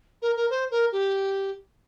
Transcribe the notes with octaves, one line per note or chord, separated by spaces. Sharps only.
A#4
A#4
C5
A#4
G4